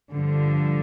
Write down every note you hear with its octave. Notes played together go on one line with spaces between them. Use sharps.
G2 D3 F3